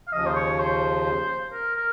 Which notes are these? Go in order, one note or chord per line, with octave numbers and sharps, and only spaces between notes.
F5
D#2 C#3 F3 D#5
C5
C#5
C5
A#4
A#4